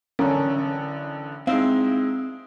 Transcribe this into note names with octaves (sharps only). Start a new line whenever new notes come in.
A1 D3 C#4 A4 A#4
G#3 C4 D#4 E4 F5